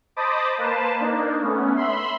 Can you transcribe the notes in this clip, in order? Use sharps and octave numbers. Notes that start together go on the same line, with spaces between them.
C5 D#5 A5 B5 D6 D#6
A#3 B4 C5 A5
A#3 D4 D#4
A3 B3 C#4
E5 B5 C6